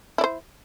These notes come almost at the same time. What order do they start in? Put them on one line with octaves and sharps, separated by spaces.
E4 D5 C5